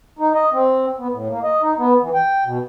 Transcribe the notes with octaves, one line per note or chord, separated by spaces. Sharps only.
D#4
D#5
C4
B3
A2
A#3
D#5
D#4
B3
E3
G5
B2